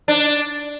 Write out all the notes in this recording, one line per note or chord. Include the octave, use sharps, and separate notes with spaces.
D4